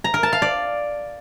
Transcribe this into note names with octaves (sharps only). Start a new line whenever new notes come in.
A#5
A#4
A5
F5
D5